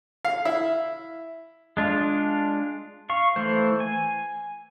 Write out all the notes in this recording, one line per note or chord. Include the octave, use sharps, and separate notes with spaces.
F5
E4
G#3 D4 F4
F5 C#6
E3 A3 C5
G#5